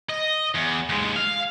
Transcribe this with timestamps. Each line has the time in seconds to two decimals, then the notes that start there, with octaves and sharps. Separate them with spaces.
0.10 D#5
0.55 E2
0.89 D#2 G#3
1.16 F5